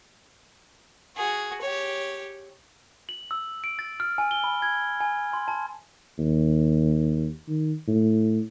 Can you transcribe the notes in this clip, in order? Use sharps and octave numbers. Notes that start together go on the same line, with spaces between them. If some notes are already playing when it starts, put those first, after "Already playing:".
F#4 G#4
G4 C#5
F#7
E6
D7
A6
F6
G#5
G7
B5
G#6
G#5
C6
A5
D#2
D#3
A2